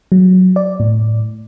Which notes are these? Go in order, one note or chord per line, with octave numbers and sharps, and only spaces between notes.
F#3
D5
A2